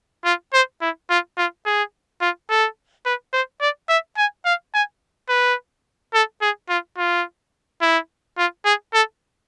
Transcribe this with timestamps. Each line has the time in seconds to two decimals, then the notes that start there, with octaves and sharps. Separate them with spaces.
0.25 F4
0.53 C5
0.81 E4
1.10 F4
1.37 F4
1.66 G#4
2.21 F4
2.50 A4
3.06 B4
3.33 C5
3.61 D5
3.89 E5
4.17 G#5
4.45 F5
4.74 G#5
5.29 B4
6.14 A4
6.42 G#4
6.69 F4
6.98 F4
7.81 E4
8.38 F4
8.65 G#4
8.94 A4